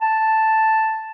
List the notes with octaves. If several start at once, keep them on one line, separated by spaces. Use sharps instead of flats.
A5